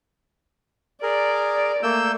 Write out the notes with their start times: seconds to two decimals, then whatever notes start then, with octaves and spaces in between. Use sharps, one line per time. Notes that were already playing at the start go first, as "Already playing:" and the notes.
1.03 G#4 A#4 D5
1.83 A3 A#3 E6 G6